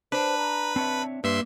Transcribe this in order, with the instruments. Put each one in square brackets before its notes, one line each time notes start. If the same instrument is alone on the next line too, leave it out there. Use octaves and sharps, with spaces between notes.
[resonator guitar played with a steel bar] D4 [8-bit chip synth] B4 B5 [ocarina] C5
[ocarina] A#5
[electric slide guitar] C4 C#5 E5 [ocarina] A5
[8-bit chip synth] G2 E5 C6 [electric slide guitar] A#3 [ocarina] B4